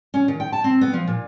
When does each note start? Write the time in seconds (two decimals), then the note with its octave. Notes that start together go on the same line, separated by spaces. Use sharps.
0.14 C#4
0.28 D#3
0.40 G5
0.52 A5
0.64 C4
0.81 B3
0.93 F3
1.07 A#2